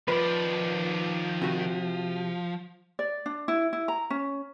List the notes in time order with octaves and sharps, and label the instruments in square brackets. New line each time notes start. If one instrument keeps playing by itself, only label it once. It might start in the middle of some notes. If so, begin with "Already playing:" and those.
[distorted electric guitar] D#3 D5 [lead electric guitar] F3 [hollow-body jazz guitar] B4
[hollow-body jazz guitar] C3 F#4
[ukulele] D5
D4
E4
E4
A#5
C#4